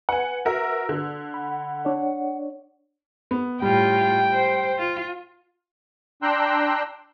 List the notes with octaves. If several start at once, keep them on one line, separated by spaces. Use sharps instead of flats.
B4 F#5 G#5
F#4 A#4 E5 E6
D3
F#5 B5
D4 C#5 D5
B3
A2 G3 F4 G5
C5
F4
D4 G5 A#5 C6 E6 F#6